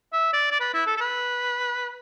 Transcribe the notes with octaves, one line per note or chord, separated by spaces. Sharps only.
E5
D5
D5
B4
E4
A4
A4
B4